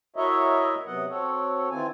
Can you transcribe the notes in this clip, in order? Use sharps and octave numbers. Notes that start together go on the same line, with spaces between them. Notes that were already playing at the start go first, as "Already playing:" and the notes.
E4 F#4 A#4 C#5 D#5 E5
C3 F#3 B3 D#5 F#5
C4 F#4 A4 C#5
D#3 E3 C4 F4 G#5